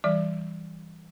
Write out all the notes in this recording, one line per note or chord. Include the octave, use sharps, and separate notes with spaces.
E3 G3 D5